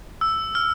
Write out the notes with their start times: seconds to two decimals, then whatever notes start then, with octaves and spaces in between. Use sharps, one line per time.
0.21 E6
0.55 F6